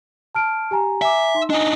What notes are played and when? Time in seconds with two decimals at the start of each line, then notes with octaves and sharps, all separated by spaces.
0.35 A5 F6 D7
0.71 G4 G#5 A#5
1.02 E5 G#5 A#5 D6
1.35 D#4 C6
1.50 D4 D#4 D#5 G#5